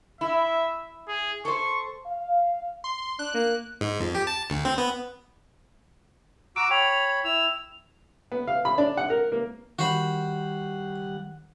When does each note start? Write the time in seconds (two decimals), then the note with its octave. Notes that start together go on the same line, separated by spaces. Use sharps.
0.21 E4 E5
1.08 G#4
1.45 A4 C5 C#6
2.07 F5
2.84 C6
3.19 D4 F#6
3.34 A#3
3.81 G#2
4.00 F2
4.15 G4
4.27 A5
4.50 D2
4.65 C4
4.78 B3
6.56 F#4 A#5 D6 E6 D7
6.70 C#5 G5 B5 F7
7.24 E4 E6 F7
8.32 B3
8.47 F5
8.65 B5
8.78 D4
8.97 F#5
9.10 A#4
9.32 A#3
9.79 D#3 G3 F#4 C5 F#5 B5